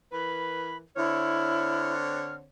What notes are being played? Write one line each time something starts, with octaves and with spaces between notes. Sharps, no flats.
E3 A#4 B4 B5
D3 C4 E4 C#5 F6